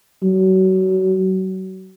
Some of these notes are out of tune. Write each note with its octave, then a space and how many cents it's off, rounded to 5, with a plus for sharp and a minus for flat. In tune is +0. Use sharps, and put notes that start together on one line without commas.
F#3 +25